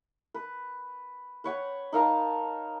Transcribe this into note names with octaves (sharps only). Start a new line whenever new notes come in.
B4
B4 C#5 F#5 G5
D#4 A#4 F5 A5